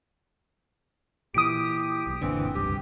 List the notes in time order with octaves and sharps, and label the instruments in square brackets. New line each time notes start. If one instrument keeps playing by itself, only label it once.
[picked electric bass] A#2 E3 [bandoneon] G4 [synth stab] D#6 D7
[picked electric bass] B1
[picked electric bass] F#1 A#2 D3 [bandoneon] E3 C4
[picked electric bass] F1 C#2 G2 [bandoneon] G4